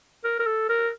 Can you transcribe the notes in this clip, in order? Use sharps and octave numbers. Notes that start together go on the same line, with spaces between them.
A#4
A#4
A4
A#4